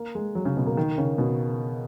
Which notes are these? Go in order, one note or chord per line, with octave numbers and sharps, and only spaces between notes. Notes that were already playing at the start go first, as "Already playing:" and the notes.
Already playing: A#3
G#3
F#3
C#3
B2
A#3
D#3
C#3
B2